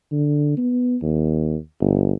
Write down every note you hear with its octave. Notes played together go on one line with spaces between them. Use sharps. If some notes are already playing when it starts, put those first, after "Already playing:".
D3
B3
D#2
G1